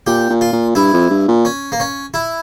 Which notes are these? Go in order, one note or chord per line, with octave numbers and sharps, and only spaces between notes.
A#2 G4
A#2
F4
A#2
G2 E4
F2
G2
A#2
C#4
A#3
C#4
E4